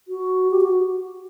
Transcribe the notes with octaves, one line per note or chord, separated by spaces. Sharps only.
F#4
G4
F#4